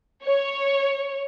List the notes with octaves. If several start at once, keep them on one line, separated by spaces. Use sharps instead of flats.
C#5